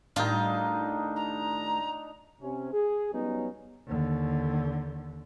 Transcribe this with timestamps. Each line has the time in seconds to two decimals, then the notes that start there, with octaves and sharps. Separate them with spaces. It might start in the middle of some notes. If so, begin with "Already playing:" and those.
0.16 A2 D#3 G3 D4 D#4 F4
1.16 A#5
2.41 C3 C#4
2.73 G#4
3.13 F#3 G3 B3 C#4 D#4
3.87 D#2 D3